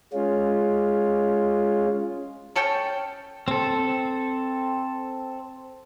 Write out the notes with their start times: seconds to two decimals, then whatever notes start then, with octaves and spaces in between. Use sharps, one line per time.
0.13 G#3 C#4 F4
2.56 C#4 A4 C#5 G5
3.48 C4 A4